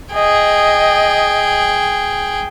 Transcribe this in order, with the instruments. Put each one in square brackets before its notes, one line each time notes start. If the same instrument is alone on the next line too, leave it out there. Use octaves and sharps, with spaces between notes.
[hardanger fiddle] G#4 G5 [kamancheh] D#5